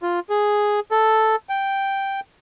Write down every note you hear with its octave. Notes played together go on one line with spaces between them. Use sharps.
F4
G#4
A4
G5